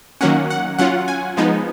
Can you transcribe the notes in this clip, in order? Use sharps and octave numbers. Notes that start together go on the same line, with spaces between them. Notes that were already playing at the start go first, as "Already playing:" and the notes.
D#3 F#3 A#3 C#4 F#5
F#5
F#3 C#4 F4 F#5
G#5
F3 G#3 B3 D#4